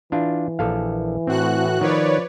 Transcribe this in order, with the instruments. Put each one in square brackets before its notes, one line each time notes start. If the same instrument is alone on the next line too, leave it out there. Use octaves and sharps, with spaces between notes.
[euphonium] E3 [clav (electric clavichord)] D4 F4
[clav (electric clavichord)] A#1 A4 F5
[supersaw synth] A2 F#4 F#6 [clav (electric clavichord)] C4
[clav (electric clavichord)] D#3 [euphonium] F3 [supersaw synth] B4 C#5 D5